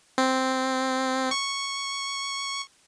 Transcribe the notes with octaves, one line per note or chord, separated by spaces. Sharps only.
C4
C#6